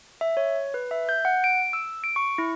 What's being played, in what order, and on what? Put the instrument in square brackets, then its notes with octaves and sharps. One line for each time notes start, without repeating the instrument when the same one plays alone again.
[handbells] E5
C#5
B4
E5
G6
F#5
D7
E6
D7
C#6
E4